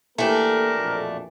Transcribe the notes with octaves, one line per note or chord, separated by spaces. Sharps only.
E3 A3 A#3 D4 G4 A4 A#4
A#1 F2 B2